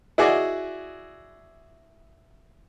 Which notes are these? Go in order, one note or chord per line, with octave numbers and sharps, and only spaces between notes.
E4 F#4 G#4 D5 D#5